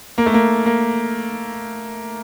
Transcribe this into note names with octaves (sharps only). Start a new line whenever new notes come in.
A#3
A3
A#3
A#3